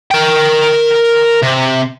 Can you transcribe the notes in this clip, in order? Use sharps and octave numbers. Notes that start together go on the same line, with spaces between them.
A#4 G5
C3